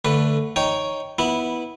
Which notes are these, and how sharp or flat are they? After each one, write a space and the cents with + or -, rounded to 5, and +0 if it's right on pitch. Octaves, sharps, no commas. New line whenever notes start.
D3 +0 A3 +15 B4 +0
D#4 +0 C#5 +0 G5 -10
B3 -5 E4 -20